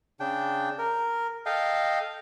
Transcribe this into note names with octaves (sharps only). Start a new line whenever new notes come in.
C#3 D4 G5
A#4
A4 D#5 F5 G5